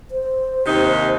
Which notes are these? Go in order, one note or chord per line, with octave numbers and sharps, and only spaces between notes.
C5
D#2 C3 D#4